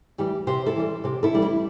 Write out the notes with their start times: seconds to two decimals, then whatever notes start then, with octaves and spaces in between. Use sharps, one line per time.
0.18 E3 G3 G4
0.47 C3 G4 C5
0.66 E4 A4
0.76 E3 G3
1.04 C3 G4
1.23 E4 A4
1.33 E3 G3 D4
1.42 E4